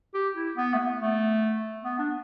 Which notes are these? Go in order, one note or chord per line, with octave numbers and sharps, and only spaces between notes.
G4
E4
B3
A3
B3
A3
B3
D4